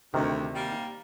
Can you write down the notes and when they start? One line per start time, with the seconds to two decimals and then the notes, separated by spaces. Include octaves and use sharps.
0.14 D2 C3 D#3
0.55 G3 A#3